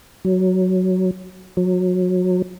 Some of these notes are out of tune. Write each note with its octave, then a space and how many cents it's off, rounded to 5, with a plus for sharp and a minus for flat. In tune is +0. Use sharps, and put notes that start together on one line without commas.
F#3 +5
F#3 -25